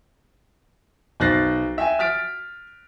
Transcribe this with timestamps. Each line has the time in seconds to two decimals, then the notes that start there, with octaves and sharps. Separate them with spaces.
1.20 B1 C5 F#6 A6 A#6 C7
1.78 E5 G5 G#5
1.99 F6 A6 B6 D7